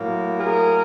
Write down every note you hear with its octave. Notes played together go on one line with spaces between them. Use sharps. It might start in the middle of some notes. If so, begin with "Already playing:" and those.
Already playing: A2 F#3 A#3
G#4 A#4